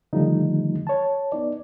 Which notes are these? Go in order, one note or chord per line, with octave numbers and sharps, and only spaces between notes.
D3 D#3 F3 G3 A3 D#4
C#5 A5
B3 D#4 D5